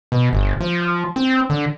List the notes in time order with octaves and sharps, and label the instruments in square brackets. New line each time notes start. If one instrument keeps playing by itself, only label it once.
[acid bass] B2
G1
F3
C4
D3